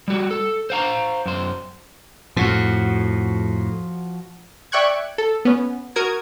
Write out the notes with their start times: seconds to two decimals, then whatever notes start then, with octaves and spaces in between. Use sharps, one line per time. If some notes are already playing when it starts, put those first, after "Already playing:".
0.08 G3 F#4
0.31 A4
0.70 C5 F5 A#5
1.26 F#2 C5
2.37 F2 A2 F3 F#4
4.72 D5 E5 G5 C#6 F#6 G#6
5.18 A4
5.45 B3 C#4
5.96 F#4 A#4 D#6 G#6